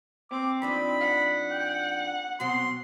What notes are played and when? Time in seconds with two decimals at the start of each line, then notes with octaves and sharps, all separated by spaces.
0.31 C4 D6
0.62 F2 D4 D#4 B5
1.01 F#5
1.51 G5
2.40 B2 F#3 C4 C6